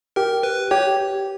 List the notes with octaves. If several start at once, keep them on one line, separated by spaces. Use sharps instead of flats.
G4 A#4
B4
G4 C#5